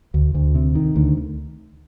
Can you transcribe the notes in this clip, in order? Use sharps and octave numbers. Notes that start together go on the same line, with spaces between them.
D2
D2
C3
D#3
D2